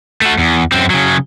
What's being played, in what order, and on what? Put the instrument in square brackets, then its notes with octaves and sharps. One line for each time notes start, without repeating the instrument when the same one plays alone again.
[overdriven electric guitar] A3 F#4
E2
F#2 C4
C#3 F#3